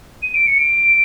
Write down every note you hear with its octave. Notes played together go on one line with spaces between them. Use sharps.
D#7
D7
C#7
D7